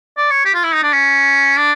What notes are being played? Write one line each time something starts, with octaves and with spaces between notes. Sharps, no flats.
D5
C#5
G4
F4
E4
D#4
D4
C#4
D4